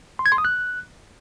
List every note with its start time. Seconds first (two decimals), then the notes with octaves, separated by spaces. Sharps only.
0.19 C6
0.26 G#6
0.32 C6
0.38 D#6
0.45 F#6